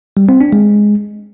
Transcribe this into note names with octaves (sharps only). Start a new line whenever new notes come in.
G3
C4
D4
G#3